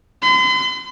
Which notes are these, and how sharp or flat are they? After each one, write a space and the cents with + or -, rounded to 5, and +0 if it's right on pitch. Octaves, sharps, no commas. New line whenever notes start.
C6 -45